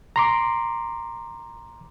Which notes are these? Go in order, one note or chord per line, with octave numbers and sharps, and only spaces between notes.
A#5 C6 D6